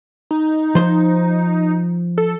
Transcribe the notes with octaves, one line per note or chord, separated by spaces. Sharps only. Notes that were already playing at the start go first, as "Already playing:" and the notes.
D#4
F3 C5
A4